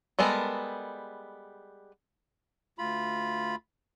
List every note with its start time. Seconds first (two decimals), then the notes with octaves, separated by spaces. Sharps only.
0.19 G3 G#3 B3 A4 A#4
2.79 D2 F4 B5